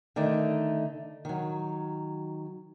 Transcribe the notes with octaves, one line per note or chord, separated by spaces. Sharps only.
D3 D#3 A3 D#4
D#3 F#3